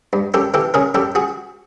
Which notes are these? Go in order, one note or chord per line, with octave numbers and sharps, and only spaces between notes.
G2
F#2 G4 A4
E3 G4 A4
C#3 G#4 A#4
F#2 G4 A4
F#4 G#4